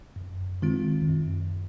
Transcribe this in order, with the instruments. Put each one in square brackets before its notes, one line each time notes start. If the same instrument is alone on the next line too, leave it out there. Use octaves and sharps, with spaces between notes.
[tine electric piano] F#2
D#3 G#3 C4 F4
F#2